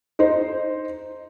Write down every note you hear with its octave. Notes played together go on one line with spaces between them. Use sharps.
D#4 C5